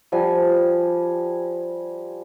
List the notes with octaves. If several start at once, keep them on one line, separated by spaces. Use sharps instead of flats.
F3 G3 G#5